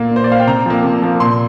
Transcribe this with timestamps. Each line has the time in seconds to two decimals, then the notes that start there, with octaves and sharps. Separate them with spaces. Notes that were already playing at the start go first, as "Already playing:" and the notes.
Already playing: A#2 A#3
0.11 A#2 C5
0.24 D5
0.30 A#3 F5
0.40 G5
0.47 C3 A#5
0.66 F3 A#3
0.84 C3
1.02 F3 A#3
1.20 A#2 C6